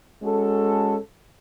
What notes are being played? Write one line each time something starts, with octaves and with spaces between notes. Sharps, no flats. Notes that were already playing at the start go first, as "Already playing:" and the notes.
G#3 C#4 F#4 A4